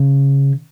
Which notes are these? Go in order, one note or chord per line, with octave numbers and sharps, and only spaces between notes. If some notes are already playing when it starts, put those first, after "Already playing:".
Already playing: C#3